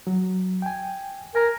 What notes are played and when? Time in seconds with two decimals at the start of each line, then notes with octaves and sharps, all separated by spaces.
0.07 F#3
0.62 G5 G#5
1.35 A#4 G#5 A#5